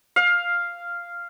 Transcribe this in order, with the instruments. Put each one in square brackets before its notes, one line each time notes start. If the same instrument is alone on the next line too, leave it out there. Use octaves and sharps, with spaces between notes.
[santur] F5